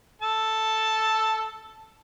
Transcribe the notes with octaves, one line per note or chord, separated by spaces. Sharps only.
A4 A5